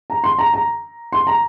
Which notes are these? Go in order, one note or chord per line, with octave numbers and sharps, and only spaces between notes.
A#5
C6
A#5
A#5
C6
A#5